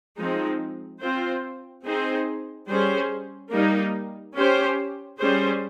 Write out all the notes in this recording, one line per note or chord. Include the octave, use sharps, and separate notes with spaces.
F3 G#3 C4 D#4
C4 F4 C5
C4 D#4 G#4 C5
G3 C#4 G#4 C5
G3 A#3 D#4
C#4 G4 C5
G3 C#4 G#4 C5